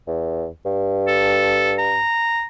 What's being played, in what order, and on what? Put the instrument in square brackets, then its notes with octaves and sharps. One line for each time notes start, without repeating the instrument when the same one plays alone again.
[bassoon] E2
G2
[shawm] A4
A#5